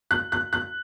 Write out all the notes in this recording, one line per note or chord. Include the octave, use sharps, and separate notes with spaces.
F#6
F#6
F#6